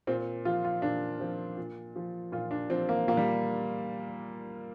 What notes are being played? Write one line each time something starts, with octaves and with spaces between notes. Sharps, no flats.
A#2 C4
F3 F4
F4
A#2 D4
F3 C4
A#2
F3
A#2 F4
D4
F3 C4
A#3
A#2 A#3
G3